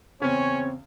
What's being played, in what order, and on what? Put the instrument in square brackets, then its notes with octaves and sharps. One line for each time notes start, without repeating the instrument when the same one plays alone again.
[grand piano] E2 C#3 [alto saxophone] C4 [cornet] C#4 [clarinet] C#5